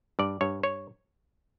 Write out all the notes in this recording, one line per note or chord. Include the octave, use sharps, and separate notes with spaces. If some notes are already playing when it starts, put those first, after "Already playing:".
G2 D5
G2 C#5
C#5